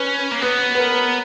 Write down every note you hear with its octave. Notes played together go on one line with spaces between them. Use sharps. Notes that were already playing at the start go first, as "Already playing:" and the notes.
Already playing: C#4 B4 C#5
A#3
B3 B4
B4
A#4